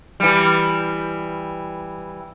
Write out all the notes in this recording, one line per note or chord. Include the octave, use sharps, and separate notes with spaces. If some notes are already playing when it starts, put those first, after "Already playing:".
E3 G3